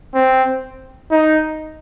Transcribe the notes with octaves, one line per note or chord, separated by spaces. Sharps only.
C4
D#4